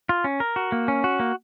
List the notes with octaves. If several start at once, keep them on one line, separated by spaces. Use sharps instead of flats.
F4
C#4
A#4
F#4
A#3
C#4
F#4
A#3